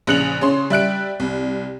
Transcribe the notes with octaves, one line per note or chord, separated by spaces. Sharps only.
A#1 C#3 F#6 C#7 F7 F#7
C#3 C#4 C6
G3 E5 F#6 D7
C2